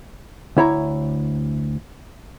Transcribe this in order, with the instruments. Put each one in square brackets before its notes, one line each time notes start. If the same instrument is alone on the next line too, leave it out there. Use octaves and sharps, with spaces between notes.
[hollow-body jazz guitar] D2 E4 C#5 A#5